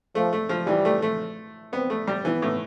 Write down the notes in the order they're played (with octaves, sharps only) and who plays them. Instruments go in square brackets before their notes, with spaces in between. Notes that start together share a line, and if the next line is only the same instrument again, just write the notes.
[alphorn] F3 [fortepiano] A3
[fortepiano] A3
F3
[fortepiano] E3 [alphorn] G3
[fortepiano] A3
A3
[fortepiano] B3 [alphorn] C4
[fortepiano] A3
G3
[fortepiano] E3 [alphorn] B3
[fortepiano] A2